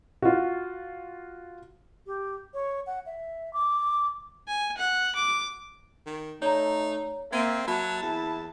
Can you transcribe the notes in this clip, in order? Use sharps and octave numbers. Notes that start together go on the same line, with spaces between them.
F4 F#4
G4
C#5
F#5
E5
D6
G#5
F#5
D6
D#3
A3 D#4 C#5 D5 A#5
A#3 C4 E5 G#6 D#7
F#3 E5 A5 B5
E2 E4